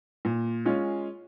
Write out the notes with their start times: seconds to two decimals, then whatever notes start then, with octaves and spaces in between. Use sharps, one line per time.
0.25 A#2
0.65 G#3 C#4 F4